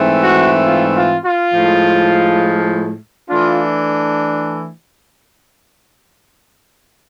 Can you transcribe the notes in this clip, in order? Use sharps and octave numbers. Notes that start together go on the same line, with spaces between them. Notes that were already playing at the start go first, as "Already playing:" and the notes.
Already playing: G#2 E3 A3 C4
F#4
F4
F4
F4
A2 F3 G#3
E3 A3 D4 F4